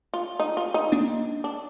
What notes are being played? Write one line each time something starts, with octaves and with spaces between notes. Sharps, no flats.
F4
D#4
F4
D#4
A#3 D4
D4